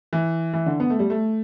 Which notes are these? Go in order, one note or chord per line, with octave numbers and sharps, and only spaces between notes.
E3
E3
D3
B3
A3
G3
A3